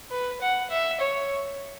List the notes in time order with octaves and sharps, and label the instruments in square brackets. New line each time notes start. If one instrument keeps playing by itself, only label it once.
[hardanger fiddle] B4
F#5
E5
C#5